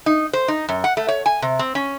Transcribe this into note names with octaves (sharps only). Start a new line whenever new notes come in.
D#4
C5
D#4
F#2
F#5
A3
C#5
G#5
C3
C4
C#4